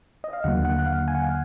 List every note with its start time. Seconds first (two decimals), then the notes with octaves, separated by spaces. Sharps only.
0.24 D#5
0.33 F5
0.44 D#2 D3 F#3 A#3 F#5
0.65 F#5
0.79 F#5
0.86 F5
1.08 G#5
1.15 F#5
1.22 F5